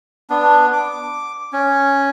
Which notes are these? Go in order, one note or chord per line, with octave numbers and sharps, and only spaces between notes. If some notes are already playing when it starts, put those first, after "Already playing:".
B3 D4
D6
C#4